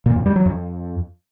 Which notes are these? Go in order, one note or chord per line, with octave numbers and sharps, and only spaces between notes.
A#2
F2
G3
F#3
F2